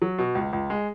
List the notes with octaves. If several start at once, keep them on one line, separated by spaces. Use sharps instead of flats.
F#3
B2
C#2
C#2
G#3